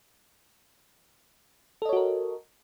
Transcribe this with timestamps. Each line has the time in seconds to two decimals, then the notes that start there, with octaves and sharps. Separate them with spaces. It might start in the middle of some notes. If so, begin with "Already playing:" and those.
1.82 A4
1.85 D#5
1.89 C#5
1.93 F#4
1.96 A#4